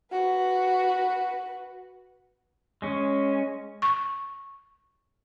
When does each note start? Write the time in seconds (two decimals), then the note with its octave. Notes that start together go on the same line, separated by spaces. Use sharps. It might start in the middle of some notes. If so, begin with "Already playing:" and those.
0.12 F#4 B4
2.82 G#3 C#4
3.82 C#6